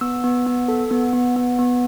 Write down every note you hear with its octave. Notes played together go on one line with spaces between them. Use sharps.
B3 E6
B3
B3
A4
B3
B3
B3
B3